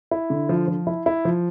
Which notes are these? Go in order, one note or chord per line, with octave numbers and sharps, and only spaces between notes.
E4
D3
F3
F3
E4
E4
F3